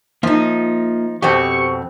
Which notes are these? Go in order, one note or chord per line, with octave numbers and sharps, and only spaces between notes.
F3 A#3 D#4 F4 E5
F2 B2 C4 G4 C#6